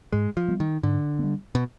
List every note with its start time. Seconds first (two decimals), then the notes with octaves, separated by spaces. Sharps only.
0.12 G#2 G#3
0.37 F3
0.48 G3 B3
0.60 D#3
0.83 G#2 D3
1.19 G3 B3
1.55 B2